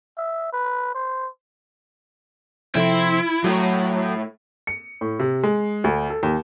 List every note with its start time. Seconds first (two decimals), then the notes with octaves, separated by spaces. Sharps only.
0.17 E5
0.53 B4
0.95 C5
2.76 C3 F3 E4 A4 C5 G5
3.44 A2 F#3 F#4
4.67 C#7
5.01 A2
5.19 C3
5.43 G#3
5.84 D2
6.10 A4
6.23 D#2